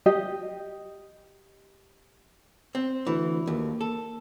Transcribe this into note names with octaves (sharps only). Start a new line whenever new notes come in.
G4 D#5
C4
D2 E3
D#2 A#3
A4